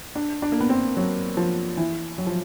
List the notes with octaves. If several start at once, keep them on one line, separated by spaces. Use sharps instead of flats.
D4
D4
A#3
B3
C4
F#3
F3
E3
F#3
F3